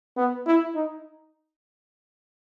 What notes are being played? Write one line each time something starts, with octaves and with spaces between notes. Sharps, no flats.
B3
E4
D#4